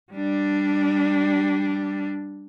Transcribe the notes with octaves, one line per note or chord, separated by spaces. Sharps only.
G3 D4